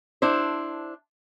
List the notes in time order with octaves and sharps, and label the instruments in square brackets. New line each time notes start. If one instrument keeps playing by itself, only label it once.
[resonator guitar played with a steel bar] D4 E4 C5